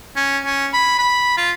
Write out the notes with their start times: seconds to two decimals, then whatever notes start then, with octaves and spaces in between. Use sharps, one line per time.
0.16 C#4
0.45 C#4
0.73 B5
0.99 B5
1.37 F4